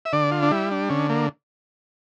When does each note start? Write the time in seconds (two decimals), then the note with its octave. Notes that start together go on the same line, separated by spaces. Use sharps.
0.05 E5
0.13 D3 D5
0.32 F4
0.42 D4
0.51 G3 E4
0.71 D4
0.90 D3 C#4
1.09 A#3